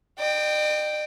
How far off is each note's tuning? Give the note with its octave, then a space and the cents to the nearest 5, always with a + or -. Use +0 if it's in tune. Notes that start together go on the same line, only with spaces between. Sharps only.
D#5 -45 G5 +0